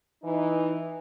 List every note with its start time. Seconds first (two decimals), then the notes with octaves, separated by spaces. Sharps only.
0.22 E3 D#4